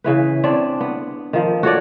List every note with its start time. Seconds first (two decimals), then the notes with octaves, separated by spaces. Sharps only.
0.04 C#3 E3 B4
0.44 C4 D4 C#5 D5
0.80 B3
1.33 D#3 F3
1.63 F#4 A4 C#5 D5